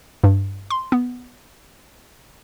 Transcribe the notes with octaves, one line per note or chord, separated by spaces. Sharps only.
G2
C6
B3